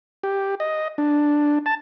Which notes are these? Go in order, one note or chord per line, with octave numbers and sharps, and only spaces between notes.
G4
D#5
D4
A5